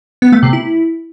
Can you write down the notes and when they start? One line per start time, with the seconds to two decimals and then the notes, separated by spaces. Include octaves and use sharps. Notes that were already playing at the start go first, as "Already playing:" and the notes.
0.22 B3
0.32 A3
0.43 C3
0.53 E4